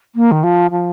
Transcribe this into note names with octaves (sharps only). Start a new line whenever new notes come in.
A#3
D#3
F3
F3